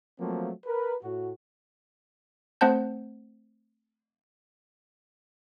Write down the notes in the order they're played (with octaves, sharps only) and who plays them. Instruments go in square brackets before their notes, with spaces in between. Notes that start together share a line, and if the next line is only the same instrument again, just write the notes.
[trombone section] F3 F#3 A3 A#3 C4
A#4 B4
A2 F#4
[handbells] A3 C4 C5 F#5 A5 G6